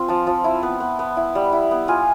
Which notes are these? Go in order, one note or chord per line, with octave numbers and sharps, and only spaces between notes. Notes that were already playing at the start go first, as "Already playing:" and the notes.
Already playing: C4 F4
F3 A5
F3
E4
B3
B3
B3
E4
G3
E4
B3
F4 G#5